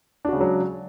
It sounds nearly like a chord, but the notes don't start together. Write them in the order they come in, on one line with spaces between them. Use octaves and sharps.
D4 F#4 C#3 G#3 F#3